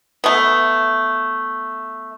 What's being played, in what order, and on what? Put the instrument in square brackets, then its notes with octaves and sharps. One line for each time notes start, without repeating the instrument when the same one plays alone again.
[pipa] A3 B3